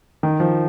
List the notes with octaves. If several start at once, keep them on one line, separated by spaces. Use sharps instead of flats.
D#3
F3